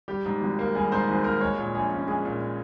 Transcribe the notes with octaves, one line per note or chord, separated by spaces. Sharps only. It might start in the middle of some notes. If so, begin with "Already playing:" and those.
G3 G4
G#2
G#1
A#3
G3 G#4
G#2 C5
G#1 G#4
A#3 A#4
G#3 C#5
A#2
A#1 G#4
C#4
G#3 G#4
A#2